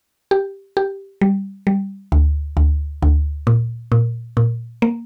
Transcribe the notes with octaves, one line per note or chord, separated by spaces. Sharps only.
G4
G4
G3
G3
D2
D2
D2
A#2
A#2
A#2
A#3